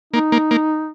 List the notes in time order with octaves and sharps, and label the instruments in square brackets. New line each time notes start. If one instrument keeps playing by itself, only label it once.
[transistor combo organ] A#3 [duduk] D#4
[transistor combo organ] A#3
A#3